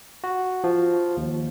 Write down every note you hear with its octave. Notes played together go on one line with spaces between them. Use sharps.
F#4
F3
D#2